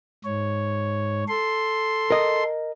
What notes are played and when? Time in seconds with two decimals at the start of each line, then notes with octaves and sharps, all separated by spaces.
0.25 G#2 C#5
1.28 A4 C6
2.11 A#4 D#5